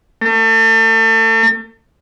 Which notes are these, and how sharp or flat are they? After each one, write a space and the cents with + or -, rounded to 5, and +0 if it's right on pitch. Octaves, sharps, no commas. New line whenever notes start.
A3 +40